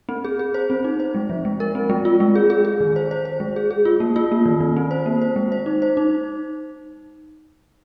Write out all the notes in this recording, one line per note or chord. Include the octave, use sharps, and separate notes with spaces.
C4
G#4
G#4
C5
C4
D#4
C5
G#3
F3
G#3
A#4
C4
G#3
F4
G#3
G#4
G#4
G#4
D#3
C5
C5
C5
G#3
G#4
G#4
F4
A#3
F4
A#3
D#3
D#3
C4
C5
A#3
C5
G#3
C5
D#4
C5
D#4